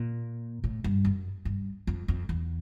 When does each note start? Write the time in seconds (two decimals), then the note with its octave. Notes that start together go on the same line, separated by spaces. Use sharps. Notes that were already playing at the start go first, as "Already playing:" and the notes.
Already playing: A#2
0.64 A2
0.84 G2
1.05 F#2
1.45 G2
1.87 F2
2.08 F2
2.29 E2